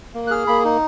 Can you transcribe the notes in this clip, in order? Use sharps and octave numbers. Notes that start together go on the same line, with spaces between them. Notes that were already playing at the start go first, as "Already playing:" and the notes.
A#3
F#6
G#4 F6
A#3 B5
D#4